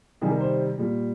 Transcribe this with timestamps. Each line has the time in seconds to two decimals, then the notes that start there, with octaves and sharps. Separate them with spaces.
0.21 C3 D#3 G3 G#4
0.31 A#4
0.40 C5
0.78 A#2 G3